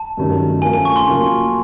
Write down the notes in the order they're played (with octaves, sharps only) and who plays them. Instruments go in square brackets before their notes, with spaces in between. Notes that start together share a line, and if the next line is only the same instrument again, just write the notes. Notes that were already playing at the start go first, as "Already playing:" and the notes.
Already playing: [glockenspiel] A5
[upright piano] G2 D#3 F#3 A3 C#4
[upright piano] F3 A3 C#4 F4 A#4 [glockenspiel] G#5
[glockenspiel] G#5
C#6
C6
[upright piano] C#3 F#3 A#3 C#4 F4